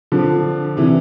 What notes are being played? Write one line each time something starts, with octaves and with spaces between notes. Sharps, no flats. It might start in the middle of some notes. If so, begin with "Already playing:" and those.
D3 F3
C3 E3